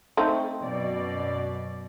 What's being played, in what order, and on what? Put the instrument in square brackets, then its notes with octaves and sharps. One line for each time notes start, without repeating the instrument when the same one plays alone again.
[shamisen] A3 C4 D#4
[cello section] F#2 B2 D5